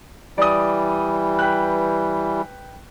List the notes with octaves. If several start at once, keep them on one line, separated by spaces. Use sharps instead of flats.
E3 G3 D5 D#6
B4 G5 F#6